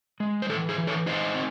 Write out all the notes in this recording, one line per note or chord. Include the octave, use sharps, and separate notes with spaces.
G#3
C5
E3 A4 C#5
G#4 C5
E3
A4 C#5
D#4 C5 D#5
C4